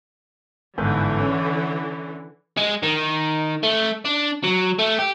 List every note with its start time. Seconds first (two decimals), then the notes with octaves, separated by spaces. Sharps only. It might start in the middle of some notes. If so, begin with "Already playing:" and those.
0.78 G1 G#2 D3 E3 B4
1.20 C#4
2.57 G#3
2.83 D#3
3.63 A3
4.05 D4
4.44 F#3
4.79 A3
4.99 G4